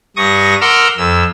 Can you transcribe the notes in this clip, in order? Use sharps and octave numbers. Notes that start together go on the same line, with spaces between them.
G2 C#6 D#6 A#6
A#4 F#5 C6 D6 E6 F6
F2 E6